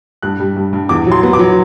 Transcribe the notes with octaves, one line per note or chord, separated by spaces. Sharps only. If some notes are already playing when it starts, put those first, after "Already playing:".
G2 F#6
G3
G2
G2
E2 D6
F#3 C6
B3
D6
F#3